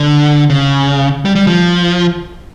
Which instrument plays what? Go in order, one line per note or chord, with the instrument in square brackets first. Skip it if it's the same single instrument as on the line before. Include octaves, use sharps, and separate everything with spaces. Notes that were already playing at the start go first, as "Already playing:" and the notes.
Already playing: [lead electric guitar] D3
C#3
G3
G3
F3